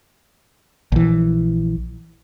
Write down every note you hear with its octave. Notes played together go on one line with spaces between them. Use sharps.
A#1 E3